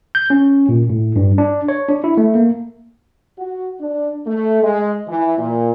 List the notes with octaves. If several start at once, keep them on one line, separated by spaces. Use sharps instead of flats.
G6
C#4
A#2
A2
G2
D4
C#5
D4
E4
A3
A#3
F#4
D4
A3
G#3
E3
A#2